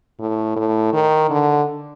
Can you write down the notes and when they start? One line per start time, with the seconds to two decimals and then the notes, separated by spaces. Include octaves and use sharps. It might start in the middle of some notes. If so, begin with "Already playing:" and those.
0.20 A2
0.56 A2
0.93 D#3
1.30 D3